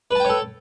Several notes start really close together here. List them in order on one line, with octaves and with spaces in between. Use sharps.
B4 A5 G5 C#5 A4